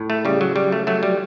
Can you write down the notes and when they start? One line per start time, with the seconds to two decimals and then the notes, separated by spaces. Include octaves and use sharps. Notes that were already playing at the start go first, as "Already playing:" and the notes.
Already playing: A2
0.10 A3
0.25 C#3 G3
0.41 F#3
0.56 F#3 G3
0.72 A3
0.87 F#3 A3
1.03 G3